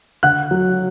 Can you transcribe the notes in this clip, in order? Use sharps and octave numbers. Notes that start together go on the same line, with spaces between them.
D3 F#5 F#6
F#3